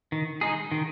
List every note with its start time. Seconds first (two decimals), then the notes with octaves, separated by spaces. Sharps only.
0.12 D#3
0.41 G#3 D#4 G#4
0.72 D#3